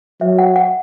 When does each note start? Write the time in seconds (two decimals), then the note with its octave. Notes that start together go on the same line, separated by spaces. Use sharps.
0.21 F#3 E5
0.39 F#5
0.56 F#5